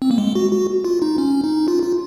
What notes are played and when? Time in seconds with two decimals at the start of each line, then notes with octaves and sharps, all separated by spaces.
0.02 C4
0.11 A#3
0.18 G#3
0.35 F#4
0.52 F#4
0.85 F4
1.02 D#4
1.18 C#4
1.44 D#4
1.68 F4
1.83 F4